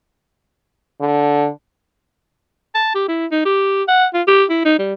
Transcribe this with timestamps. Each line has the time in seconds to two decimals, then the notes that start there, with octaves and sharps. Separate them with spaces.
1.01 D3
2.75 A5
2.95 G4
3.08 E4
3.32 D#4
3.45 G4
3.88 F#5
4.14 F4
4.27 G4
4.50 E4
4.65 D#4
4.79 G3